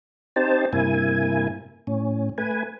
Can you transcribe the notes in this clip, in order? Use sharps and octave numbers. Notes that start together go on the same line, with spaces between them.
C4 D#4 G4 C5 A5
G2 C3 A#3 E4 G#5
A2 C#4
A3 B4 G#5